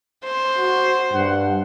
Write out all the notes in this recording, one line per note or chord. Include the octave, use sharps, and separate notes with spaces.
C5
F#4
G2 F#5